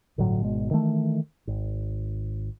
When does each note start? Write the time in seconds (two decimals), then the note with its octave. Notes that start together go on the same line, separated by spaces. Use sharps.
0.18 G1 A2 D3 F#3
0.40 G#1 B2 G#3
0.71 D#3 E3 A3
1.47 G#1